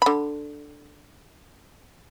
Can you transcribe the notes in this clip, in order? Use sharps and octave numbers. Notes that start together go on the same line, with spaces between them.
D3 B5